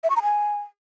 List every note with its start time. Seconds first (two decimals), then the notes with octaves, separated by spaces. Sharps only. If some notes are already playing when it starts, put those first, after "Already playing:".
0.04 E5
0.10 C#6
0.16 A#5
0.23 G#5